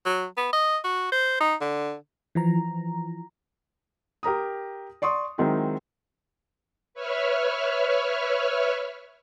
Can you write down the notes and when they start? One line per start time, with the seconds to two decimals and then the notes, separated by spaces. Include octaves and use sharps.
0.06 F#3
0.37 B3
0.53 D#5
0.84 F#4
1.12 C5
1.40 D#4
1.61 D3
2.35 E3 F3 A#5
4.23 G4 A#4 A#5 D#6
5.02 D5 C6 C#6 D#6
5.38 D#3 F#3 G#3 C4 D#4 E4
6.94 B4 C#5 E5 F6